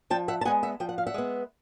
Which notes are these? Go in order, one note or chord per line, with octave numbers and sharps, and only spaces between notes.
F3 G5 A5
E5 F#5
A5
G#3 B3 F#5 G#5
E5 F#5
F3 G5
F#5
F5
E5 F#5
G#3 B3